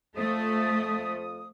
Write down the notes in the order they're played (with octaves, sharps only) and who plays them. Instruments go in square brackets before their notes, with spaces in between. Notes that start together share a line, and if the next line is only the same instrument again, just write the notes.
[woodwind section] F2 F3 D#6 [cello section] A3